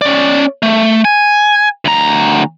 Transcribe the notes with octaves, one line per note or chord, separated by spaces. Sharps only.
C#4 D5
A3
G#5
D2 A#5